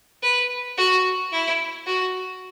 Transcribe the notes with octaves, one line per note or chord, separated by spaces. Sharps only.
B4
F#4
E4
F#4